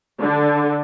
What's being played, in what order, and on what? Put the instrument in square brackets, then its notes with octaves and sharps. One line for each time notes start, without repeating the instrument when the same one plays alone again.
[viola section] D3